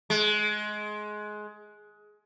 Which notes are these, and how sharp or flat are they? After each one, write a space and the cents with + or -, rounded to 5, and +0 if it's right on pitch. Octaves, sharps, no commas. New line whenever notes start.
G#3 +20